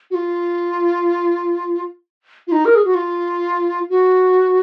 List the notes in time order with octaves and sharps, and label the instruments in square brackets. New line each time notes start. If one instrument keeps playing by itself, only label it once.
[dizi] F#4
F4
F4
D#4
A#4
G#4
F#4
F4
F#4